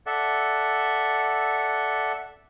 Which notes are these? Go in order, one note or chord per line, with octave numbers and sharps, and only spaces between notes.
A4 D5 E5 F#5